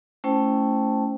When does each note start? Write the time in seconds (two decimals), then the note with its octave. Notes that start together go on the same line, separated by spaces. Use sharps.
0.24 A3 C#4 E4 C5 G5 A5